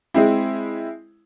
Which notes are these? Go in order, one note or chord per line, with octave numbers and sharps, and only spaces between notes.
G#3 C4 E4